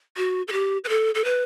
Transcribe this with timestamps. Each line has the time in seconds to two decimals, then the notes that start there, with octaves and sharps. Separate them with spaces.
0.17 F#4
0.48 A4
0.52 G4
0.84 B4
0.89 A4
1.15 A4
1.25 B4